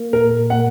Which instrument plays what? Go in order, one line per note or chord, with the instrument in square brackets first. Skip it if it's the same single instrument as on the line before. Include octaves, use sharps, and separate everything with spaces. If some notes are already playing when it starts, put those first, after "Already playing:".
Already playing: [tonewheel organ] A#3
[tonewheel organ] A#2 [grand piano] A#4
[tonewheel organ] A#3 [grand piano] F#5